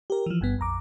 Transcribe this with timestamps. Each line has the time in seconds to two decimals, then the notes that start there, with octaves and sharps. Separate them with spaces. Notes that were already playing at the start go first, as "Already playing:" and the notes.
0.10 G4 A#4
0.26 E3 F3
0.41 G1 G2 B3
0.58 A#1 F2 A#5 D6